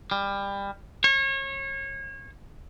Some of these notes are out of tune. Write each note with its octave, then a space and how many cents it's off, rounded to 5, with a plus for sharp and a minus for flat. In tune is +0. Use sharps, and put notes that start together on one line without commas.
G3 +25
C#5 -30